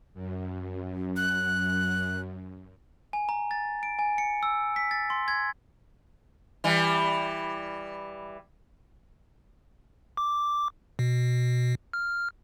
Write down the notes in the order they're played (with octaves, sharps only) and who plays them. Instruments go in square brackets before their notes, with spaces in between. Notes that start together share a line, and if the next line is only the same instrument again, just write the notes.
[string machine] F#2
[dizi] F#6
[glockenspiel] G#5
A#5
A6
D7
G#5
C#7
E6
B6
A6
C6
G#6
[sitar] E3 G3
[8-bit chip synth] D6
B2
F6